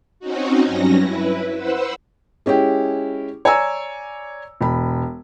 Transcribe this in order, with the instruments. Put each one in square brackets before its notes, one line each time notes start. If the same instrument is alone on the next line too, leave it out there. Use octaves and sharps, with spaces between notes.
[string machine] C4 C#4 D#4 F#4
G2 F#3 C#4 A#6
E4 B4
B4 C5 F#5 E6
[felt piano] G#3 C#4 E4 G4
C#5 D5 G#5 A#5 E6
E1 B5